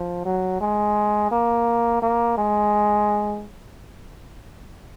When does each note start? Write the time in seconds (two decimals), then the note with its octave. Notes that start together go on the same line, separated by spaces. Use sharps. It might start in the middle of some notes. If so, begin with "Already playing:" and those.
Already playing: F3
0.25 F#3
0.61 G#3
1.31 A#3
2.02 A#3
2.38 G#3